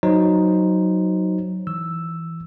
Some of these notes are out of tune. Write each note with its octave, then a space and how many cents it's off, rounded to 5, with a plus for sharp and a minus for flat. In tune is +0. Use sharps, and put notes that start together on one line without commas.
F#3 +0 D#4 +0 C5 +0
E3 +0 E6 +0